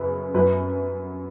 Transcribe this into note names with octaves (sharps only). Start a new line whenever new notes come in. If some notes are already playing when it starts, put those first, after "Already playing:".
Already playing: F#2 C#3 B4
F#2 F#3 B4